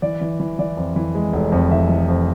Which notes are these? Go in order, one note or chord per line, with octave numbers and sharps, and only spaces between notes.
E3 D5
E3
E3
E3 D5
F2
E3
G#3
F1
F2
E3 E5
E3
F2